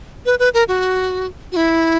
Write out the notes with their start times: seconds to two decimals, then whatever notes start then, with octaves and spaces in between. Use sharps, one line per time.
0.26 B4
0.39 B4
0.54 A#4
0.68 F#4
1.52 F#4
1.56 E4